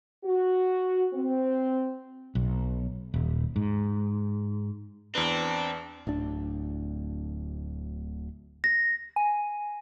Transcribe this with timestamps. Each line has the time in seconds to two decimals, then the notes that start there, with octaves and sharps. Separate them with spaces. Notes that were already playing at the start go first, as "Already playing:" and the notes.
0.24 F#4
1.14 C4
2.35 B1
3.14 D#1
3.56 G#2
5.15 E2 C4 D4 B4
6.07 D1 D2 D4
8.64 A#6
9.16 G#5